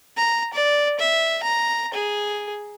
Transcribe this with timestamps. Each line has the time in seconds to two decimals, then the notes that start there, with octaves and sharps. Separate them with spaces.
0.17 A#5
0.54 D5
0.99 E5
1.43 A#5
1.94 G#4